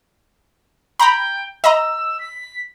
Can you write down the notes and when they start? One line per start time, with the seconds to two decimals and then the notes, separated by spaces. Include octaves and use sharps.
1.00 G5 A#5 B5
1.64 D#5 A#5 E6
2.20 B6